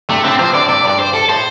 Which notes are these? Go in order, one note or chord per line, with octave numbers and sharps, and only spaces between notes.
G2 C3 A3
A2 D3 C4
C3 F3 C5
A2 D3 D5
G2 C3 D5
G2 D5
C5
A4
A2 C5